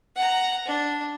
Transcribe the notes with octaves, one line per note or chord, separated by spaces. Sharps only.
F#5 A#5
D4